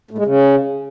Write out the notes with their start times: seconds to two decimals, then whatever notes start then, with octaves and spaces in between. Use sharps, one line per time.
0.11 A2
0.18 G#3
0.25 C#3